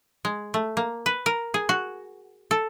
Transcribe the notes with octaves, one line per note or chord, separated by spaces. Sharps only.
G#3
A3
A#3
B4
A#4
G#4
F#4
A4